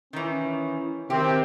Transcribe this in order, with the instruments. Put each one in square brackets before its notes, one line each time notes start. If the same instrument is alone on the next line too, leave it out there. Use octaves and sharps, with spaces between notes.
[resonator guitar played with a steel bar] D#3 E3 [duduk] C#4
[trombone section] C3 C4 [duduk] D#3 [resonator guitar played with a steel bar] G4